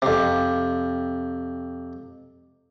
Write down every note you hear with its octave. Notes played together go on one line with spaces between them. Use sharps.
F2 C3